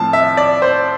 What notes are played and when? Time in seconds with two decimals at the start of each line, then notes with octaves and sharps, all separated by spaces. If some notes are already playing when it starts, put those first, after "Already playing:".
Already playing: A2 F3 C4 A5
0.13 E5
0.37 D5
0.62 C5